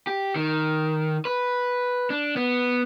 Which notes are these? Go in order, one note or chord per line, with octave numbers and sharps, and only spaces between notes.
G4
D#3
B4
D4
B3